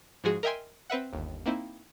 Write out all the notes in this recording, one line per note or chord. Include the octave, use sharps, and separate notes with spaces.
G#2 F3 G#3 F#4 G#4
A#4 D#5 E5 G5 G#5 C6
C4 B4 E5 F#5
G1 D#2
A#3 C4 D#4 E4